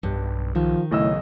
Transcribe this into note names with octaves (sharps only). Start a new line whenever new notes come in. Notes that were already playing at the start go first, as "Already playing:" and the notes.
B1 G2
D#3 F3
B1 A2 C#3 D#5 E6